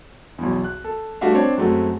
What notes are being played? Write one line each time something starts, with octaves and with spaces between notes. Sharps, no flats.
B1 E2
F#6
A4
G3 A3 D4 F#4 E5 F5
C4 D4 C#5
F#2 G#3 A3 C4 F#4